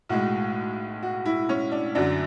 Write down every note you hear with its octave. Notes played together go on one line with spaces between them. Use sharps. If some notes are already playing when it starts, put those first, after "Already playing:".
B1 A2 G#3 F#4
F#4
E4
C#4
D4
F#2 D3 F#3 D4